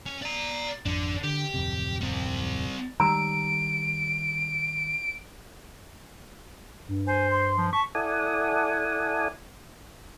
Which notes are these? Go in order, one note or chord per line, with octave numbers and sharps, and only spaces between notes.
C#4
D5 A#5
G#1 F2 D3 D4
D3 G4
D1 F2 C3
G3 C4
D#3 G3 A#5 E6 D7
G2
C5 G#5
C6
F3
A5 C#6 B6
E4 A4 D5 F#5 G#5 D#6